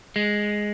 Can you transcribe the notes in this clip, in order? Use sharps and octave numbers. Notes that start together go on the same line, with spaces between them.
G#3